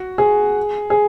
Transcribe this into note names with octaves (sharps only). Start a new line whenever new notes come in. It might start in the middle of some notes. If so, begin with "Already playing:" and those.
Already playing: F#4
G#4
G#4